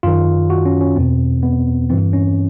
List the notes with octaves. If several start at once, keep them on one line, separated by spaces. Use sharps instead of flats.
F#2 D#3 F4
F#4
C#4
C#4
E2 B2 C4
B3
G2 E3 C4
C#4